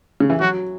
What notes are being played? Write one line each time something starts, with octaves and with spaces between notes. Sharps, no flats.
C#3
E3
F#3 F#4